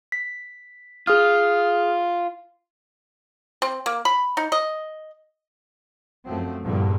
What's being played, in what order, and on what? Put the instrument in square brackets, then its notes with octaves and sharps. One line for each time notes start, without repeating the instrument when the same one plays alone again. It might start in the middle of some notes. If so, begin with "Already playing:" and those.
[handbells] B6
[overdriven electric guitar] F4 [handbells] G#4 D#6 F6
[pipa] C4
A#3
B5
D#4
D#5
[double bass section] F#2 F3 A3 C4
E2 G2 A#2 D3 F3 G3